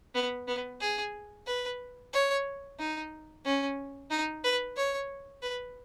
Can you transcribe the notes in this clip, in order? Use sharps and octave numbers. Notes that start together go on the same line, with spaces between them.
B3
B3
G#4
B4
C#5
D#4
C#4
D#4
B4
C#5
B4